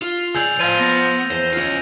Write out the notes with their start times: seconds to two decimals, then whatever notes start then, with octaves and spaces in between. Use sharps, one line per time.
0.02 F4
0.35 C#2 G#4 D5 E6 G6 F7
0.60 F3 D5 F5 D#7
0.79 B3 A#6
1.31 E2 C5
1.53 C#4 F4